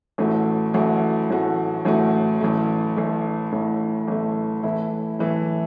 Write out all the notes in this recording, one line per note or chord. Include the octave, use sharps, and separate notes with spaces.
A1 A2 A3 F#4
A1 A2 A3 F#4
A1 A2 A3 F#4
A1 A2 A3 F#4
A1 A2 A3
A1 A2 A3
A1 A2 A3
A1 A2 A3
A2 E3 A3 E4
A2 E3 A3 E4